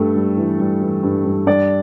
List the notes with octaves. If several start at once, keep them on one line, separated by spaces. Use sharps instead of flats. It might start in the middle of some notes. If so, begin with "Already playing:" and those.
Already playing: G2 G3 A3 A4
G3
E3
G3
E3
G2
G2
G3 D4 D5